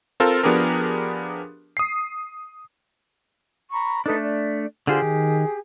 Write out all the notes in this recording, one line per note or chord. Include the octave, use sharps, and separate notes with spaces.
C4 F4 A4 A#4
F3 B3 D4 G4 G#4 A#4
D#6 C7
A#5 B5 C#6
A3 D4 D#4 A4 B4
D5
D3 F4 G4 G#4 C5
D#3